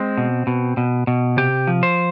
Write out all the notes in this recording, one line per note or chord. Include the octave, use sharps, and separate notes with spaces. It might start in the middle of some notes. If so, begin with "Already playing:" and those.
Already playing: G#3 C4
B2
B2
B2
B2
C3 G4
F3
C5